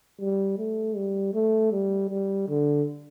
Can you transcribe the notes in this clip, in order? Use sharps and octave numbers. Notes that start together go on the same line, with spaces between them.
G3
A3
G3
A3
G3
G3
D3